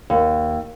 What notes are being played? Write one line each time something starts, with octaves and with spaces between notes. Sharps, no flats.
D#2